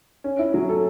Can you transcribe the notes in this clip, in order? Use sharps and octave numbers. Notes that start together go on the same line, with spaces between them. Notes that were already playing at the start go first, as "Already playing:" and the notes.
C#4
E4
F#3
A4